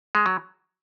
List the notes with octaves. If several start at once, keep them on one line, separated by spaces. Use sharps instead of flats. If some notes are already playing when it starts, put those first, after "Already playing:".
G#3
F#3